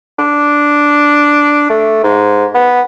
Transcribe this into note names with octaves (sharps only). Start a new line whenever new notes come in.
D4
A3
G#2
B3